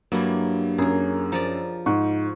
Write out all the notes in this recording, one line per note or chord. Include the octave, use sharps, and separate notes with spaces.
G2 F#3 A#3 E4
F#2 G#4 A#4
F3 D5 A#5
G#2 C#6